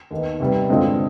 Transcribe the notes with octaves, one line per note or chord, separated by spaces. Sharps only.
D#2 D#3 B3
C3 G3 B3
G2 D3 G#3 C4 F4